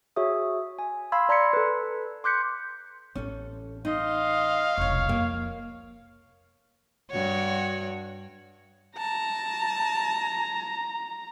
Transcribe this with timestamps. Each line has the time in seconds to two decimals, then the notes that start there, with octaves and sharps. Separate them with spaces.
0.16 F#4 G#4 C#5 E5 D#6
0.79 G#5
1.12 F5 B5 C6 E6 G#6
1.29 D5 A#5 C6 G#6 B6 C#7
1.53 A4 B4
2.24 C6 D6 F#6 G6 B6 C#7
3.15 A1 C#4 A4
3.85 D#4 D#5 F5 C6
4.78 E1 C2 C#5
5.09 F2 A#3
7.11 G2 F#4 C#5
8.98 A5 A#5